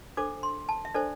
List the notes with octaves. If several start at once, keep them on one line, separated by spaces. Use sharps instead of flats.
D4 A4 C5 D6
C6
A5
E5
D4 A4 C5 D5